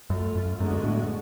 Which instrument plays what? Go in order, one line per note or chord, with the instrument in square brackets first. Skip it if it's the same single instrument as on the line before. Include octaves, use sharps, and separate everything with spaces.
[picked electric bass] F#2 [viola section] A3 F4 A4
[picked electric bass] F#2
[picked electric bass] F#2 [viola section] D3 G#3 B3 D4 F#4
[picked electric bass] A2